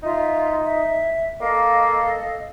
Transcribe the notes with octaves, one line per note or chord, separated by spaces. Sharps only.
D#4 F4 E5
E5
A#3 A4 D#5 F5